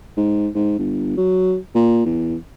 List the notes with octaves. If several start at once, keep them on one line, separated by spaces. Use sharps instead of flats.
G#2
G#2
G1
F#3
A#2
E2